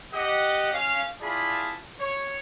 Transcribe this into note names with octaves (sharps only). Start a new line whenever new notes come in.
G4 D#5 F#5
C#4 F5
E4 F4 G#4 D5 A5 B5
C#5